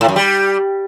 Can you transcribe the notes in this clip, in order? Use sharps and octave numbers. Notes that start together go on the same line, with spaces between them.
A2
F#2
G3